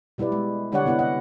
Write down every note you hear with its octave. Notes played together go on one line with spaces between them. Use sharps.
B2 G3 E4 B4 D5
G3 G#3
D3 G3 D4 C#5 D5 F#5
C3 B3 E4 B4 F#5
D#5 F#5